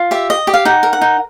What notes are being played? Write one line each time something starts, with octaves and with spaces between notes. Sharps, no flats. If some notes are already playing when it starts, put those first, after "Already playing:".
Already playing: F4
G4 E5
D#5
G4
F5
D#4 F#5
A#4
F#5
D#4